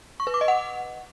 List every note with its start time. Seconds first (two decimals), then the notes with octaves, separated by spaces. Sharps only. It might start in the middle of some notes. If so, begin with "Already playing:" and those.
0.20 C#6
0.27 B4
0.34 D6
0.41 D#5
0.48 F#5